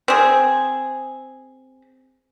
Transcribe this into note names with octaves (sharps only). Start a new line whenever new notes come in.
C4 G#4